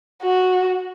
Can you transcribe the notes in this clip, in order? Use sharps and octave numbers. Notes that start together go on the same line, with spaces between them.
F#4